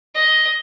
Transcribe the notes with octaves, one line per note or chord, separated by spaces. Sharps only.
D#5